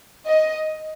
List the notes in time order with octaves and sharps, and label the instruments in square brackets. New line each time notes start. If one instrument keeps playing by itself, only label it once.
[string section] D#5